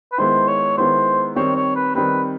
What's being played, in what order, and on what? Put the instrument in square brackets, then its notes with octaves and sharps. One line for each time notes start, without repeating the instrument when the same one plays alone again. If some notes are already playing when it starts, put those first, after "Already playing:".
[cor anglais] B4
[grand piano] D#3 G#3 B3 E4 [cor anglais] C5
[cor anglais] C#5
[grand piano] D#3 G#3 B3 E4 [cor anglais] C5
[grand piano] D#3 G3 C4 [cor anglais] C#5
[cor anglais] C#5
B4
[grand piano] D#3 G3 C4 [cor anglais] B4